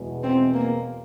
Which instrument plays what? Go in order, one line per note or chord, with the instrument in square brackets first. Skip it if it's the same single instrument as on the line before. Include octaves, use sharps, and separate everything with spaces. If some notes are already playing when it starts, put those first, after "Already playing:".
Already playing: [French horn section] E2 B2 G#3 B3
[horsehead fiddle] C4
A#3